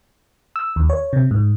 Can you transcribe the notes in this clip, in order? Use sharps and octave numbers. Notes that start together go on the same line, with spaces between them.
E6
D#2
C#5
C3
G#2